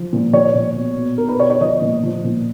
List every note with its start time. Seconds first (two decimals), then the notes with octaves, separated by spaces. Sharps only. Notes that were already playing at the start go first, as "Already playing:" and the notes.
Already playing: F3
0.13 A#2
0.33 F3 C#5
0.54 A#2
0.76 B2
0.97 B2
1.18 B2 A#4
1.29 B4
1.40 B2 C#5
1.50 C#5
1.61 F3 D#5
1.82 A#2
2.03 F3
2.24 A#2